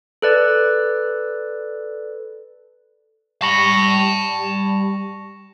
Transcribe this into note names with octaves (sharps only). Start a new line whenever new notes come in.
A4 B4 D5
G3 A5 B5 C#6 A#6 C#7